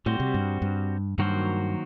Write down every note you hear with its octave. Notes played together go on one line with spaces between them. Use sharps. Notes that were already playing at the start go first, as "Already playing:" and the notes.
A2 G3 C4 F#4 C5
C3
G2
G2
G2 D#3 F#3 A#3 F#4 C5